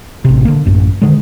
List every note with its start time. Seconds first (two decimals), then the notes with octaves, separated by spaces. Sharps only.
0.25 A1 C3
0.45 D3 A#3
0.65 A1 F#2
1.02 D3 D#3 G#3